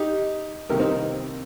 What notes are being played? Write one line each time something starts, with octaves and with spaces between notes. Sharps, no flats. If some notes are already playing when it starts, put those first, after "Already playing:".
Already playing: D#4 G4
C2 C3 D#3 A#3 G4 A#4
C4 D#4